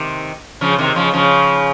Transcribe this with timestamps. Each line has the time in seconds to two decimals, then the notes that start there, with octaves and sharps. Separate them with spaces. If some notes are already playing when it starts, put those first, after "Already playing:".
Already playing: C3 D#3
0.61 C#3 F3
0.78 C3 D#3
0.96 C#3 F3
1.13 C#3 F3